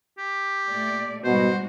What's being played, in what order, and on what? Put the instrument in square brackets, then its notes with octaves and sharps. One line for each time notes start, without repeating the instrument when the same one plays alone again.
[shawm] G4
[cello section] A#2 A3 D5
[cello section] G#2 G3 F#4 [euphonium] B2 [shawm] C5